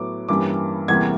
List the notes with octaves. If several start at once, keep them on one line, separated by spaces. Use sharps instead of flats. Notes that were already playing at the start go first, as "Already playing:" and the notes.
Already playing: A2 F#3 B3 D6
G2 E3 G3 A#3 C#4 D6
E2 C3 E3 G3 A#3 G#6